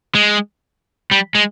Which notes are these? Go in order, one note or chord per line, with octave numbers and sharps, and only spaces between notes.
G#3
G3
G#3